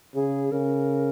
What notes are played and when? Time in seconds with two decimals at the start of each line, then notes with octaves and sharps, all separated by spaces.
0.15 C#3 G#4
0.52 C#3 A#4